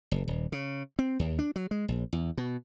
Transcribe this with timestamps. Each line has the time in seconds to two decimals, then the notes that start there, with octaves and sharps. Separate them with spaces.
0.11 F#1
0.28 D#1
0.52 C#3
0.99 C4
1.19 D#2
1.39 D4
1.56 F#3
1.71 G#3
1.88 A#1
2.13 E2
2.37 B2